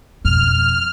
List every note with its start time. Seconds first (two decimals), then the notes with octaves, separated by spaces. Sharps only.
0.25 F2 B2 F6